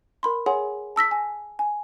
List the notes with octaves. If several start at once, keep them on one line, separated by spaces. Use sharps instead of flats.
A#4 B5 C6
G#4 C#5 F#5 G#5 C6
A5 E6 A#6 B6
G#5
G#5